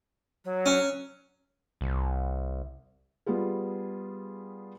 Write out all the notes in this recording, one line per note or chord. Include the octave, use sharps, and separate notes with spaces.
F#3
C#4
C2
G3 B3 F4 G#4